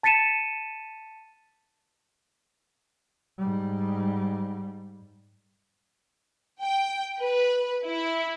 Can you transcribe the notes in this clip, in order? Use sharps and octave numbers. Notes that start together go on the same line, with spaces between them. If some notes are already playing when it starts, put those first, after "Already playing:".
A5 A6 B6 C#7 D#7 E7
G#2 G3
G5
B4
E4